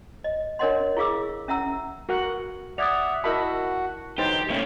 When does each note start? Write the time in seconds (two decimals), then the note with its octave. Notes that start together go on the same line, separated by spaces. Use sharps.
0.24 D#5
0.59 D4 A#4 C#5 D#5 F#5 C6
0.97 E4 G#4 F5 D6 E6
1.48 C#4 E5 F#5 A#5 E6
2.09 F#4 A#4 F#5
2.78 D5 E5 F#5 D#6 G#6 F7
3.24 E4 F#4 A#4 D#5 E5 F#5 A5 B5
4.18 D3 E3 F#3 D#4 G4 C5
4.50 A3 A#3 C4 C#4